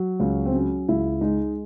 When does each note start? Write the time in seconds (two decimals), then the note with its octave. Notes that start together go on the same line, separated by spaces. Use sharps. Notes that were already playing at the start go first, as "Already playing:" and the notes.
Already playing: F#3
0.20 C#2 C#4
0.46 C4
0.53 F#3 C#4
0.88 C#2 E4
1.21 G#3 D#4